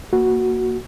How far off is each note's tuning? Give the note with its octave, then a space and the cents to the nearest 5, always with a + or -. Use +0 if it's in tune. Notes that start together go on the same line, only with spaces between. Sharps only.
A#3 +0 F#4 +0